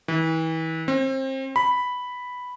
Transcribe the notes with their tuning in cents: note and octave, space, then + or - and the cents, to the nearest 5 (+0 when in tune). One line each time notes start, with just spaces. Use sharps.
E3 -35
C4 +30
B5 +0